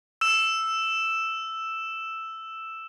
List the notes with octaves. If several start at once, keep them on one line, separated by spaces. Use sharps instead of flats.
E6 E7